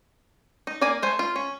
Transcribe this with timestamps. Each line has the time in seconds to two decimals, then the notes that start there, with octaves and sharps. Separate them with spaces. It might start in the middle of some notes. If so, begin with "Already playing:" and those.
0.67 D#4
0.81 A#3 D5 G#5
1.02 A3 C5 G#5
1.19 F4
1.36 C#4